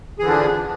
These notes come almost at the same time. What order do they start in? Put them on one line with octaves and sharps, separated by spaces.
G#4 E3 D3 F3 D4